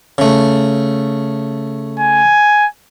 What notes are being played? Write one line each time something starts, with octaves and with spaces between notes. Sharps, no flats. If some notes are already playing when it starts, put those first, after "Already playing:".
C#3 A3
G#5